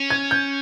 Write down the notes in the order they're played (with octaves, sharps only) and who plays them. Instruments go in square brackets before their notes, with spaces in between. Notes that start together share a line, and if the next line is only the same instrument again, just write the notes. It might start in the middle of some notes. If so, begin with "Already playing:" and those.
Already playing: [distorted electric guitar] C#4
[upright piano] G#6
G6